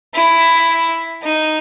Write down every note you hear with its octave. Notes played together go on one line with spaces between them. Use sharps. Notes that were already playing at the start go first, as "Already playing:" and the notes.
E4
D#4